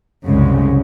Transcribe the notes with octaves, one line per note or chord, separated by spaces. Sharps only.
C2 F#2 C#3 G#3